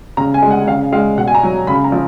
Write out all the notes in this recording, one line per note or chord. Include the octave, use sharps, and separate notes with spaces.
C#3 A#5
G#5
G#3
F#5
C#3 F5
G#3 F5
B2 F#5
G#5
A#5
F#3
C#3 B5
A#5
F3